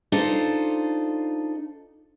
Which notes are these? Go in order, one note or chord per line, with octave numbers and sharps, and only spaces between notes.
D4 D#4 F4 A4 C5